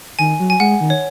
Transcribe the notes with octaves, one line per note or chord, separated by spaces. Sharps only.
D#3 G#5
F#3
G#5
G#3 F#5
D#3
C#5